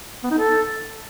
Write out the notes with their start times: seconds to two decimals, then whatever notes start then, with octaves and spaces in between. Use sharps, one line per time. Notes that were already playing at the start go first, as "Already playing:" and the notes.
0.24 B3
0.31 D#4
0.38 A4